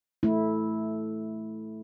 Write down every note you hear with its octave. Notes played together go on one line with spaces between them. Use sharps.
A3 E4